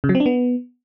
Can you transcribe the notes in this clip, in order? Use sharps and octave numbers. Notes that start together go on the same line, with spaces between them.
C#3
F#3
C4
D4
B3